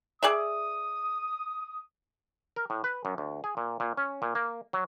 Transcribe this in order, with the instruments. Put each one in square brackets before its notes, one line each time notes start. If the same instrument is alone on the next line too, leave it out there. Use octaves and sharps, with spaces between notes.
[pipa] G#4 D5 E5 [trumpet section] D#6
[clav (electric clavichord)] A#4
A2
B4
F#2
D2
G#4
A#2
A#2
C#4
A#2
A#3
F#3